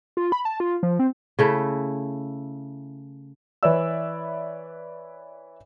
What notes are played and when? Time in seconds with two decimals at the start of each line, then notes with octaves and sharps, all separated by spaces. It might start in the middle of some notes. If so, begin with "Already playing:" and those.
0.17 F4
0.32 B5
0.45 A5
0.60 F4
0.83 F3
0.99 C4
1.39 C#3 A3 E4
3.63 E3 B4 C#5 D5 E5 E6